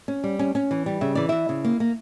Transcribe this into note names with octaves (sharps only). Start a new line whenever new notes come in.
C#4
G3
C#4
C#4
E3
G3
C#3 E5
E3 D5
E3 E4 E5
C#3
A#3
A#3